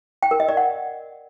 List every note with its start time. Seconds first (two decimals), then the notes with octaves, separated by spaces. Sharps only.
0.23 G5
0.31 A#4
0.40 D#5
0.49 D5
0.57 F#5